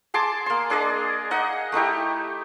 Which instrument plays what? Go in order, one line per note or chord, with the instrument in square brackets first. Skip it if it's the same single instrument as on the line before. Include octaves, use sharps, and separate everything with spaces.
[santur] G#4 A5 C6 D6
A#3 C6
D4 G#4 D5 D#5
D#4 D#5 F#5
A3 D#4 E4 G4